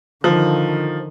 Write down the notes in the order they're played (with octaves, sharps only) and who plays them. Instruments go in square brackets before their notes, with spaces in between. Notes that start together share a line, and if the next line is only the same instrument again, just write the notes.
[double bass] D3 D#3 [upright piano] F3